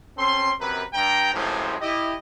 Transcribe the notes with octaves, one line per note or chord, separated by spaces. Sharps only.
C4 C#4 A4 C6
F#2 C3 A#4 B4
G2 G5 A#5
F#2 A2 C3 E3 F3 G#3
E4 G4 D#5